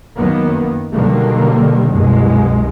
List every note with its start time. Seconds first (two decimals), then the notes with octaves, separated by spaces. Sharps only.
0.16 F#2 D#3 A#3 B3
0.92 B2 D3 D#3 F#3 G3 A#3
1.92 C2 F#2 B2 G#3